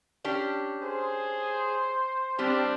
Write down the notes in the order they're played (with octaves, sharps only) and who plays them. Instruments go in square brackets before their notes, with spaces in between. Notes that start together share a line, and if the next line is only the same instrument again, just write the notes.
[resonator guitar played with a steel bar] C#4 D4 G4
[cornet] G#4 [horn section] C5
[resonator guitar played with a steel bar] G3 G4 [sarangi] C4 [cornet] D4